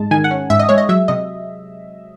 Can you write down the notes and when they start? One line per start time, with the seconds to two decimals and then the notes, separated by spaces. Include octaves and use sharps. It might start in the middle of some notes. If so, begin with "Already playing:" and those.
Already playing: G#2 G#3 A5
0.11 D#3 G#5
0.24 F#5
0.31 C#4
0.50 G#2 E5
0.59 D#5
0.69 G#3 C#5
0.78 D#5
0.89 F#3 E5
1.08 C3 D#5